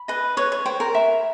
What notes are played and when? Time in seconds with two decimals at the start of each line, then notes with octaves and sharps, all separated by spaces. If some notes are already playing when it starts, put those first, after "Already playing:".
Already playing: B5
0.08 B4 D#5
0.37 B4 C#5
0.52 C#5
0.66 C5 G5
0.80 A#4
0.94 E5